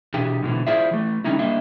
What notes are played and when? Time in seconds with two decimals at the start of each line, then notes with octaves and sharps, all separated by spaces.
0.14 B2 E3 D4 G4 G#4
0.42 G#2 B2 D3 E3
0.67 E4 F4 G#4 C5 D5 E5
0.91 E3 A3
1.24 D3 G3 C#4 D#4 E4
1.39 G3 A#3 D4 D#5 E5